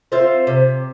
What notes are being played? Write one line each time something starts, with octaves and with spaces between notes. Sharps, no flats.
C4 F4 C5 E5
C3